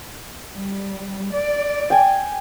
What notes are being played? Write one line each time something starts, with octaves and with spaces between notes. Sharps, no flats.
G3
D5
G5 G#5